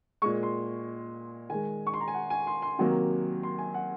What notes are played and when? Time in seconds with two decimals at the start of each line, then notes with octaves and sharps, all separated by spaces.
0.22 A#2 G#3 C#6
0.43 C6
1.50 D#3 G#3 G#5
1.87 C#6
1.94 C6
2.01 A#5
2.08 G#5
2.14 F#5
2.30 G#5
2.47 C6
2.62 C6
2.79 C3 D#3 F#3 A#3
3.43 C6
3.59 G#5
3.74 F#5